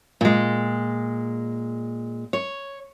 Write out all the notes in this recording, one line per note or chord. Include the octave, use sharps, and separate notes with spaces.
A#2 G#3
C#5